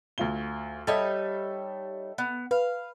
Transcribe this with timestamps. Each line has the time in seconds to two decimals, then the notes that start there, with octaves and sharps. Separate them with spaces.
0.18 D2 F4 G7
0.87 G3 D#4 A4 C#5 E5
2.18 B3
2.51 B4 F5